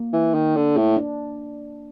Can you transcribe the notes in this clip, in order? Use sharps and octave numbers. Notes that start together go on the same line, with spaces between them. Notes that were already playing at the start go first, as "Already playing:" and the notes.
Already playing: A#3
E3
D#3
D3
A2
D4